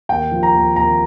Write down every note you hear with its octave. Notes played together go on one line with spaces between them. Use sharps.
D#2 G5
F3
A#5
D#2
D#2 A#5